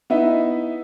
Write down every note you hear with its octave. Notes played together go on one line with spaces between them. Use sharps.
B3 D#4 E4 E5